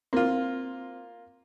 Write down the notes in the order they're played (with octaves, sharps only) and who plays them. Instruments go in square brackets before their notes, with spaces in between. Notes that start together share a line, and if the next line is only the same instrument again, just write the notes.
[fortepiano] A#3 F4 [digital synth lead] C4